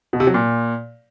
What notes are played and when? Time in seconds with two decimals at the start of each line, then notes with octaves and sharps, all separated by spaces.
0.13 B2
0.20 C3
0.27 F#3
0.34 A#2